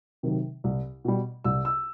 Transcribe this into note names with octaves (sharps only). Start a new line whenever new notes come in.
C3 D#3 F#3
C2
B2 G3
C2 E6
E6